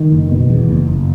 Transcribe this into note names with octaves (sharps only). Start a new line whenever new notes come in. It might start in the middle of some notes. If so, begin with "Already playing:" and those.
Already playing: D#3
F#1
B2
E2
F#1
F#1